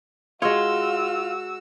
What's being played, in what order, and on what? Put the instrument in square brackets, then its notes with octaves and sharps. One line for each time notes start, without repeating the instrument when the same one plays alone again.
[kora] G#3 C#5 [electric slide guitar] F4 [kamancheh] F#4 E6